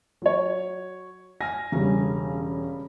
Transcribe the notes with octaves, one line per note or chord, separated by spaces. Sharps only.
F#3 C#5
G#5 F6 A#6
E1 C#3 G3 C#4